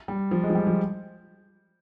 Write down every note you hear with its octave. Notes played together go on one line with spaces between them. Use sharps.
G3
F3
G#3
F3
G3
F3